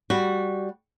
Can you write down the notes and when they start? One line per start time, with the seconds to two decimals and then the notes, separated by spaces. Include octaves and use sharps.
0.10 G3 F#4